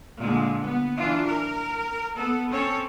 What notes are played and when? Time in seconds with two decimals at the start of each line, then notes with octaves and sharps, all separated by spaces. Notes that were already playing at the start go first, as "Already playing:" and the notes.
0.20 A#2 D3 G#3
0.61 B3
0.97 E3 D4 F4
1.27 A#4
2.17 B3 A4
2.52 C4 C#4 A4 C#5